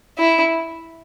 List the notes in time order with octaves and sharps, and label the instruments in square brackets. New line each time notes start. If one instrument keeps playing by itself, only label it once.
[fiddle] E4